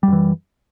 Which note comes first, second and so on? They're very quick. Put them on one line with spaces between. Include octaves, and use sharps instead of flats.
G3 F#2 E3